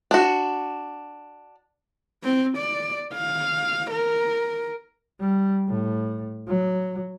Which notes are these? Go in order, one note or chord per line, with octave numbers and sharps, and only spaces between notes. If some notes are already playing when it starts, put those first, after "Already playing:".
D4 F#4
C4
D5
F5
A#4
G3
A2
F#3